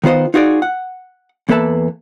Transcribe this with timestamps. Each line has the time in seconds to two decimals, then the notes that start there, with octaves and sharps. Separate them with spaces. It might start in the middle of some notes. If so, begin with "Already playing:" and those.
0.04 D#3 B3 F4 C5 D#5
0.34 D#4 F4 F#4 G#4 C5 D5
0.62 F#5
1.49 E2 A#3 A4 B4 E5 A5